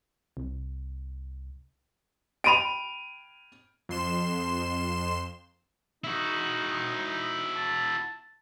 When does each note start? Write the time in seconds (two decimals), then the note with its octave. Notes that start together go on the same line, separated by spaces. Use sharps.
0.37 C2
2.44 G5 B5 D7 D#7 F7
3.89 F2 C6 E7
6.04 D#4 E4 F#4
7.55 A5